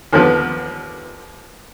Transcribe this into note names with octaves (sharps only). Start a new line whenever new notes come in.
D#2 D3 F3 B3